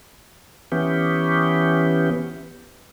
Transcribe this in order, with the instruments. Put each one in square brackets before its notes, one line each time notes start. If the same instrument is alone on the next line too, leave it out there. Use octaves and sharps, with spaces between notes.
[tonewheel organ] E3 B3 C#4 G4